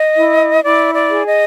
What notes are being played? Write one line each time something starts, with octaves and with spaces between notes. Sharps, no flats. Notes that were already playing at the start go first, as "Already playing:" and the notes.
Already playing: D#5
E4
E4 D5
D5
G#4
D#5